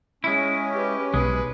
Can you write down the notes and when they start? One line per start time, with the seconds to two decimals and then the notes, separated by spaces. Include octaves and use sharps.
0.24 G#3 C#4 E4
0.72 G4 B4
1.14 B1 G#3 B4